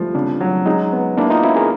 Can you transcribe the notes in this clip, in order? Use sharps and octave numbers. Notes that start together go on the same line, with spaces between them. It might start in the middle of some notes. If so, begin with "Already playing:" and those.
Already playing: F3 G3 A3
C#3 C4 D4
F#3
G#3 C#4 D#4
B3
A#3 D4 E4
D#4 F4
C#4 E4 F#4
G#4 A#4